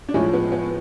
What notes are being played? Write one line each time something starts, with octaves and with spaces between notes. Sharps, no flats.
D4
A2 F3 G#3 C#4
B3
B3